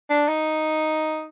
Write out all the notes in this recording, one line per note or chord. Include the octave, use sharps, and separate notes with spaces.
D4
D#4